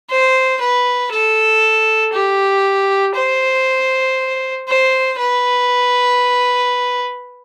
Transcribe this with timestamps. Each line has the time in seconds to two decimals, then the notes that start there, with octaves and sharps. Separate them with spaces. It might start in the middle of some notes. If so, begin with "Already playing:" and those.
0.10 C5
0.61 B4
1.11 A4
2.13 G4
3.15 C5
4.68 C5
5.19 B4